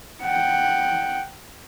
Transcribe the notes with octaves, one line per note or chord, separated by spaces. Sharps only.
F#5 G5